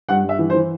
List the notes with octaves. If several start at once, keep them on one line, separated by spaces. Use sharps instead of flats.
G2 F#5
G2
E5
E3
C5
E3